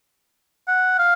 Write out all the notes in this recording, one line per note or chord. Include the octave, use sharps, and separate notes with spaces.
F#5
F5